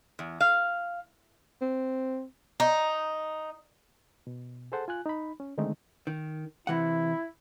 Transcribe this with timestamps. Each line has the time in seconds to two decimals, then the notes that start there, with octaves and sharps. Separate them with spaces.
0.19 E2
0.41 F5
1.61 C4
2.60 D#4
4.27 B2
4.72 G#4 A4 C5 F#5 A5
4.88 F4 G#5 F#6
5.06 D#4 B5
5.40 C#4
5.58 D3 D#3 G#3 A3 C4 D#4
6.07 D#3
6.67 C3 E3 E4 F#5